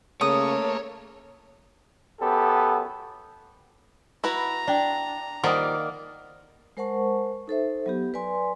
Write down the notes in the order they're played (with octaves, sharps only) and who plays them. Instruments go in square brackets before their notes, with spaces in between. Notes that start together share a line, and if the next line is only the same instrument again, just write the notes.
[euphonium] C#3 [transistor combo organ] A3 A#3 [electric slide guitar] C#5 [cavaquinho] D#6
[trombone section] F#2 B3 G4 A4
[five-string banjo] E4 F#4 B4 [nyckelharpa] A#5
[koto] D4 [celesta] D5 G5
[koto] D#3 A#3 D5 [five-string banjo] F3 G3 [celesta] F#5 D#6
[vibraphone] G#3 A#4 C5 F#5 A5 C#6
D#4 A4 C5 E5
F#3 B3 G4
B4 D5 G#5 C6